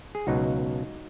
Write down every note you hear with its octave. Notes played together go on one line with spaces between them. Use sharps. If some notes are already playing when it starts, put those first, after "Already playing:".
G#4
C#2 B2 F#3 D#4 F#4